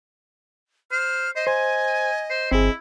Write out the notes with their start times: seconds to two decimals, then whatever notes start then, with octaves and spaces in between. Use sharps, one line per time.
0.91 C5 F6
1.36 C5 D#5
1.47 C5 G#5
2.30 C5
2.51 G1 C4 E4 G#4